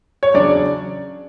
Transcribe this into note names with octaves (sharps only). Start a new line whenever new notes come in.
C#5
E2 C#3 F#3 D4 D5